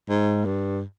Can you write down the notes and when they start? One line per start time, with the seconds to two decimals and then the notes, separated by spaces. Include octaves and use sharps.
0.09 G#2
0.45 G2